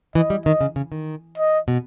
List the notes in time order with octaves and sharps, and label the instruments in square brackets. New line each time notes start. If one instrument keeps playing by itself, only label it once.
[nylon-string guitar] E3 [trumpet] D#5
[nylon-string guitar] G3
[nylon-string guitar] D#3 [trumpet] D#5
[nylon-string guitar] C#3
C#3
D#3
[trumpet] D#5
[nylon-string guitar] B2